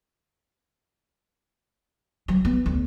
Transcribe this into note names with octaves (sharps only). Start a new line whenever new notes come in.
F#3
B3
D2